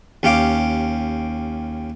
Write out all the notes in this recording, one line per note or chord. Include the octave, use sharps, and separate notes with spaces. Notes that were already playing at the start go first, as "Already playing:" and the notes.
D#2 C#4 G4 F5 D6